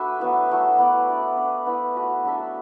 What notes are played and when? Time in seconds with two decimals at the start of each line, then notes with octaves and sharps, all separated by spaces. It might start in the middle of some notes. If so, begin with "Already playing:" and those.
Already playing: A3 D4 F#4 A4 B4 E5
0.20 F#3 B3 E4
0.49 F#3 A3 F#4
0.78 B3 E4 D5
1.08 D4 F#4 A4 E5
1.36 D4 B4 D5
1.66 B3 E4 B4 D5
1.95 A3 F#4 B4
2.25 F#3 D4 A4 E5